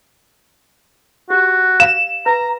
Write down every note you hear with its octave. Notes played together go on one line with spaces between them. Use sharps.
F#4 G4
F5 E7
B4 A#5